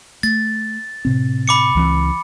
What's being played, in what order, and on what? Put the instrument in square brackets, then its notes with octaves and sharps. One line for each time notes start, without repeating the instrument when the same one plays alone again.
[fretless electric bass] A3 [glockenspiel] A6
[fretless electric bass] A2 C3 C4
[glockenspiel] B5 D6 C#7
[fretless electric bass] C#2 E3 C4